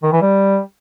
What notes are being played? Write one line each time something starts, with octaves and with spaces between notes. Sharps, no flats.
D#3
E3
G3